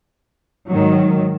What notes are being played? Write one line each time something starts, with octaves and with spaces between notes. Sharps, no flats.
G#2 D#3 F#3